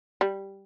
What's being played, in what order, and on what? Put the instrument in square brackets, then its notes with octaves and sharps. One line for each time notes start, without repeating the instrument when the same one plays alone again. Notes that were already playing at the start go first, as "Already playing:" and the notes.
[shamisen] G3